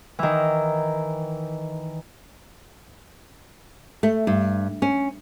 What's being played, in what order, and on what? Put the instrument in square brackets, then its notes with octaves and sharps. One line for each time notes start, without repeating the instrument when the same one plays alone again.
[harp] D#3 E3
[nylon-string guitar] A3
G2
C#4